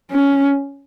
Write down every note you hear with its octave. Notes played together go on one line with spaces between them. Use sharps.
C#4